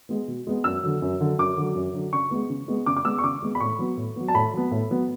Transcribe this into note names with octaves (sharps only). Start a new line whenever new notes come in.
G#3 B3
B2
G#3 B3
F#2 E6
D3 F#3
F#2
D3 F#3
F#2 D6
D3 F#3
F#2
D3 F#3
C#3 C#6
G#3 B3
C#3
G#3 B3
C#3 D6
D6
G#3 B3 E6
C#6
C#3 D6
G#3 B3
B5
A2 C#6
F#3 B3
A2
F#3 B3
A5
A2 B5
F#3 B3
A2
F#3 B3